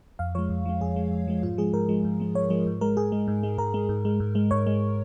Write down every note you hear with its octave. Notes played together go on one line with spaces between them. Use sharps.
F2 F5
F3 G#3 C#5
F2
F3 G#3
F2 G#4
F3 G#3
F2
F3 G#3
G#2 F4
F3 G#3 G#4
G#2 A#4
F3 G#3
G#2
F3 G#3
G#2 C#5
F3 G#3
G#2
G#3 A#4
G#2 G#4
G#3
G#2
G#3
G#2 A#4
G#3
G#2
G#3
G#2
G#3
G#2 C#5
G#3